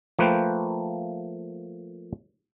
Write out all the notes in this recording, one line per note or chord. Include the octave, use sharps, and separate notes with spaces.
F3 A3 A#3 B4 C5 G5